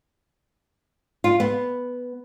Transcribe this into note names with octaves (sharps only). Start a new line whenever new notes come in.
F4
B3